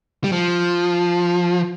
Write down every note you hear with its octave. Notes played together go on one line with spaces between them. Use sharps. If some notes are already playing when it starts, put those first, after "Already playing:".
G3
F3